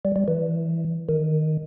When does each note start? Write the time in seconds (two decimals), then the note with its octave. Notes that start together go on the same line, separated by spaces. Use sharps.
0.05 G3
0.16 G3
0.28 E3
1.09 D#3